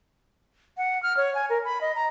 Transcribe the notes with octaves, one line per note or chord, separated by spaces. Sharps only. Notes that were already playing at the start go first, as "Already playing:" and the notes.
F#5
F6
C#5
G#5
A#4
B5
D#5
A#5